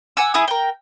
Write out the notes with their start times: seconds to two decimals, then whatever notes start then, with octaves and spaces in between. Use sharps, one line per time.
0.17 F#5 G#5 D6 E6
0.34 E4 G#4 D#6
0.48 A#4 G5